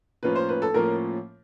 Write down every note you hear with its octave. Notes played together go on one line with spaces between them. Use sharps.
A2 F3 A#3 C#4 F4 B4
C5
B4
A4
A2 F3 A#3 C#4 F4 A#4